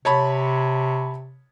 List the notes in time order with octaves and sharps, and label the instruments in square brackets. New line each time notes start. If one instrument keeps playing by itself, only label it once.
[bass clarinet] C3 [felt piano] C#5 A5 B5